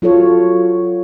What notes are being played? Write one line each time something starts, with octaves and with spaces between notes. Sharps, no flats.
F#3 F4 A4 C#5